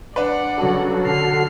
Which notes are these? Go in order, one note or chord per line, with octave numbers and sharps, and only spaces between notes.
D4 B4 D5 F#5
C#3 F#3 F#4 A4
D3 F6 C7